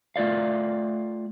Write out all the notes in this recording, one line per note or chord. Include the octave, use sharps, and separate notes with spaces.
A3 F4 D5 F5